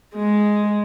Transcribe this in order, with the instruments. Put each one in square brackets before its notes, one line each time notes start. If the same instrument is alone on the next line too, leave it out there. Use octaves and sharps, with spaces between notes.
[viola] G#3